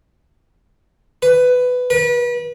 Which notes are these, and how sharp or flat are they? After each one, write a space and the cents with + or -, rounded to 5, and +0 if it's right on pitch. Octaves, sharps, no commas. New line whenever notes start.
B4 +10
B4 -35